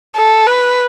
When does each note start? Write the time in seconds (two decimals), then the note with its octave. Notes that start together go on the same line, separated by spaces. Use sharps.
0.16 A4
0.47 B4